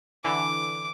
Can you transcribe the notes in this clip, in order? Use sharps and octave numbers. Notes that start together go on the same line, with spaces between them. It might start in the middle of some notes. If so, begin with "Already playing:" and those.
D3 E3 D6